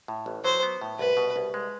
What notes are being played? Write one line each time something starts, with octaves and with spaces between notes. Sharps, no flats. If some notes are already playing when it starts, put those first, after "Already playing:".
A2
A1
F#3 C5
B3
A2
C2 B4
B2
C2
G#3